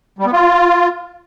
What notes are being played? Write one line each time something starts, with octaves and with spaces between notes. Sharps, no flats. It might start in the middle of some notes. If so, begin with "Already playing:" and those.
G3
B3
F4